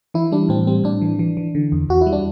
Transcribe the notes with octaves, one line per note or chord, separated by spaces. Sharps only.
E3 E4
G3 D4
A2 C4
G3 C4
A2 D4
E3
E3
E3
D3
E2
E2 F#4
E4
G3
D4